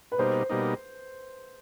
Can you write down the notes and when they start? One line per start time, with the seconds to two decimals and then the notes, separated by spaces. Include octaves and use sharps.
0.12 B4
0.18 B2 G3 A#3 D#4 C5
0.49 B2 G3 A#3 D#4